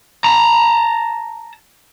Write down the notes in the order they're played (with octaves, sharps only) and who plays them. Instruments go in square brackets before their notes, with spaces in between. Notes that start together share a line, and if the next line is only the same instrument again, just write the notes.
[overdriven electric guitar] A5 A#5